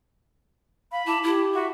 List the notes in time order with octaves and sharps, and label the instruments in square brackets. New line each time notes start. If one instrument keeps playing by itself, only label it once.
[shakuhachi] F5 [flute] B5
[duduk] E4 [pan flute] A5 [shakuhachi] D6
[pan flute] E4 [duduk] G4
[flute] F#4 [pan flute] E5